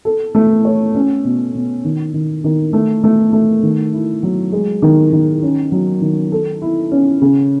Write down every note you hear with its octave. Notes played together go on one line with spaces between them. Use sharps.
A4
A3
C#5
C#4
B2
B2
D#3
D#3
D#3
A3
A3
A3
D#3
E4
F#3
G#3
D#3
D#3
C#4
F#3
D#3
A4
E4
C#4
C#3